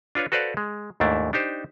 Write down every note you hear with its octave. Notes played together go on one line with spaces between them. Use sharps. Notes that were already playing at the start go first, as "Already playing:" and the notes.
D4 F4 B4 C#5
F#4 A4 B4 C5 D5 F5
G#3
D#2 G#2 A3 D4 E4
D4 D#4 G4 C5